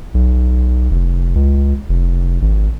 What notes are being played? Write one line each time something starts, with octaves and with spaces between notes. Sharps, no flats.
B1
F1
C#2
F1
G#1